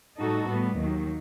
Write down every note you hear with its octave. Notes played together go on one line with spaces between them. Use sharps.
A2 G3 D#4 F#4 A4
A2 G3 B3
D#2 D#3 F#3